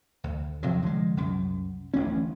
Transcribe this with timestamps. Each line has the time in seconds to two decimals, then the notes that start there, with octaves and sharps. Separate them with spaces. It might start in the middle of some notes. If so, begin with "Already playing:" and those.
0.24 D2
0.63 E2 C3 F3 F#3
0.82 D3 F3 G#3
1.17 C2 F#2
1.94 D1 A1 E3 C#4